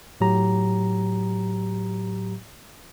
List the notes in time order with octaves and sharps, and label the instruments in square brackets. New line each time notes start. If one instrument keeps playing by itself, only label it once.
[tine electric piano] A2 F#3 G4 A#5